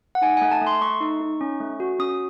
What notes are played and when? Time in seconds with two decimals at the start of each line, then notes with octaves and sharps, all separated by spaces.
0.15 F#5
0.22 D#4 G#5
0.37 A3 G#5
0.52 A5
0.62 A3 C6
0.81 A3 C#6
1.01 D#4
1.21 D#4
1.41 C#4
1.60 A3
1.80 F#4
1.99 C#4 D#6